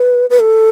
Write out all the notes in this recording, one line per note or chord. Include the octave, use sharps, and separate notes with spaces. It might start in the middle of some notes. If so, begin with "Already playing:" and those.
Already playing: B4
B4
A4